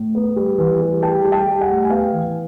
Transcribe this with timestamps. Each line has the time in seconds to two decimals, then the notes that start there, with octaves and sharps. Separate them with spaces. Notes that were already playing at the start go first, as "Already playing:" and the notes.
Already playing: A2
0.15 B3
0.36 G3
0.58 E3
0.81 G3
1.03 G3 G5 A5
1.25 G3
1.32 G5 A5
1.46 G3
1.61 F#5 G#5
1.69 A2
1.85 G#5
1.90 B3 F5 G5
2.13 E3